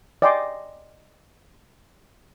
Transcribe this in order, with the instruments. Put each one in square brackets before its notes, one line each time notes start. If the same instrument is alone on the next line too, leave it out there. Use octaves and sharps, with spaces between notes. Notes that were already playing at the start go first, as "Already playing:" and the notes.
[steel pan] D5 D#5 G5 G#5 C6 D6